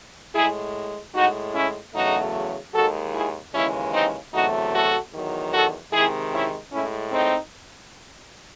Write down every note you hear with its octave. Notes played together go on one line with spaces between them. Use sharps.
A2 G#3 E4 G#4
A2 G#3 D#4 F#4
C#4 E4
E2 C#3 F#3 A3 D#4 F#4
D#2 D#3 G#3 F#4 A4
E4 G#4
D#2 C#3 E3 G#3 C#4 E4
C4 D#4
E2 C3 F#3 A3 D#4 F#4
F#4 A4
E2 D#3 F#3
F#4 A4
C3 D#3 G#3 E4 G#4
C#4 E4
A2 G#3 C#4 E4
C4 D#4